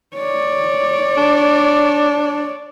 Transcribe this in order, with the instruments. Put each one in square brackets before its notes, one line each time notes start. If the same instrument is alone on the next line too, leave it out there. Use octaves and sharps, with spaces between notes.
[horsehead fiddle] C#5 D5
[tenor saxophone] D4